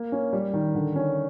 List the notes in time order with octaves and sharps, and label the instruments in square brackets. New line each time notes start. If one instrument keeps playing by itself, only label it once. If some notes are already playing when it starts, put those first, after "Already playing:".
Already playing: [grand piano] A#3
C#4
G3
D#3
D3
C#4